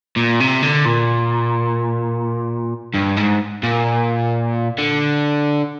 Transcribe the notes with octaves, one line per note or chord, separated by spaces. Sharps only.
A#2
C3
D3
A#2
G2
G#2
A#2
D3